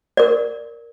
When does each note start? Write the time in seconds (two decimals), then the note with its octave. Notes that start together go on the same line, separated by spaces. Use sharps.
0.17 A#4 D5